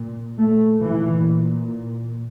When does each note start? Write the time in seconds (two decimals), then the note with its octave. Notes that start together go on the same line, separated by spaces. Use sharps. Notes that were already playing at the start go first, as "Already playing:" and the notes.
Already playing: A#2
0.38 A3
0.83 A#2 E3